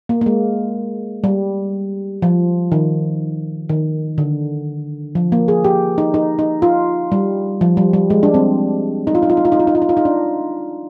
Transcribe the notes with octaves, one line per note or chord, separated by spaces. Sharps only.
A#3
A#3
G#3
G3
F3
D#3
D#3
D3
F3
A#3
G#4
G4
D#4
D#4
D#4
F4
G3
F3
G3
G3
G#3
D4
C4
D#4
F4
D#4
F4
D#4
F4
D#4
F4
D#4
F4
D#4
F4
D#4
D4